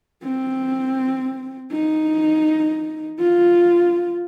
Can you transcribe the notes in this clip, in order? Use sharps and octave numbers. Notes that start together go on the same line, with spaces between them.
C4
D#4
F4